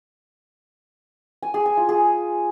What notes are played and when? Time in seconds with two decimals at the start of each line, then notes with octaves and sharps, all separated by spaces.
1.42 G#5
1.54 G#4
1.66 G#5
1.77 F4
1.89 G#4